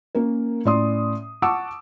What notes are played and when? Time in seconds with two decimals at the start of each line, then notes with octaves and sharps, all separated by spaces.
0.15 A#3 C#4 A#4
0.65 A2 C#4 D5 C6 D#6
1.42 F#5 A5 C#6 D6 E6